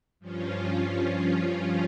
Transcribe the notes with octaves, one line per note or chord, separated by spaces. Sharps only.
G2 F3 C#4 F4